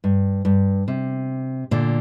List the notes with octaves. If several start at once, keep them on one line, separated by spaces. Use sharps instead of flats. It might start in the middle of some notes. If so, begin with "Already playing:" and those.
G2
G2
C3
A#2 D3